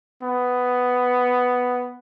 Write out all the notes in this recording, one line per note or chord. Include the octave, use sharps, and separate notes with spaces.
B3